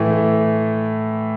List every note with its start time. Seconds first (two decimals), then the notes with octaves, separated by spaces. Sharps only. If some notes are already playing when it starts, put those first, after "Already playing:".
Already playing: A2 E3 A3
0.10 A3